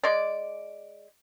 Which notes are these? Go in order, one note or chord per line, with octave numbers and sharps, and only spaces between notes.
G#3 D5